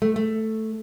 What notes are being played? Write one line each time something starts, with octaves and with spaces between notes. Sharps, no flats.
A3
A3